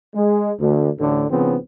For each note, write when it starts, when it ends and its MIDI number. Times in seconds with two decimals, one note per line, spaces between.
0.15 0.51 56
0.60 0.88 38
0.98 1.24 33
0.98 1.24 38
0.98 1.24 45
0.98 1.24 50
1.29 1.56 32
1.29 1.56 49
1.29 1.56 53
1.29 1.56 59
1.29 1.56 60